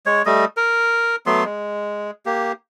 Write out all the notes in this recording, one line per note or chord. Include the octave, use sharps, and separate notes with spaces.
G#3 C#5
G3 A3 D#5
A#4
F#3 A3 B3 C6
G#3
A#3 G4